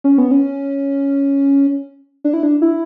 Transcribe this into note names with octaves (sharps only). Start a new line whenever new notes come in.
C#4
B3
C#4
D4
E4
D4
E4